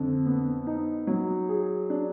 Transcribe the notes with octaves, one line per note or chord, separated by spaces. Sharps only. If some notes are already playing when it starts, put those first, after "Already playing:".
Already playing: F2 D3
B3
D#4
F#3
G#4
D4